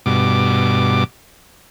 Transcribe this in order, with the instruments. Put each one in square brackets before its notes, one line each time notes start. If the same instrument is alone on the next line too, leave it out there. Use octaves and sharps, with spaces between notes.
[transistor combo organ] G2 B2 D6